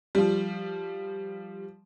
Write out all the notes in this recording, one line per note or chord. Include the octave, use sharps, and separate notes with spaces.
F3 G3